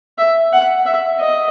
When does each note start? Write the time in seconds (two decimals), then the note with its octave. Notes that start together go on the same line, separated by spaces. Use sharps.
0.18 E5
0.53 F#5
0.86 E5
1.20 D#5